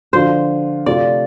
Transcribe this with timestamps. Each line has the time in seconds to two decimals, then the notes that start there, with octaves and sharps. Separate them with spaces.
0.13 D3 F3 D4 F4 C5
0.86 C3 A3 F4 D5